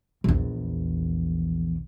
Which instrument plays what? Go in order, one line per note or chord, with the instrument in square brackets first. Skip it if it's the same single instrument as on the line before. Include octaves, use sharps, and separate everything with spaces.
[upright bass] A#1 E2